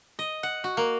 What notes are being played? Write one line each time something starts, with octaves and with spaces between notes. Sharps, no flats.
D#5
F#5
F#4
A#3